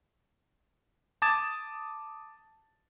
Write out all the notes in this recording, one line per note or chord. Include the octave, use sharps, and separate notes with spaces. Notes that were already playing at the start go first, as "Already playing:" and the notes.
A5 D6 D#6 G#6 A6 E7